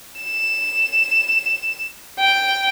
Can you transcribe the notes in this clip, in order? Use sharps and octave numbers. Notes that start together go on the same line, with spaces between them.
E7
G5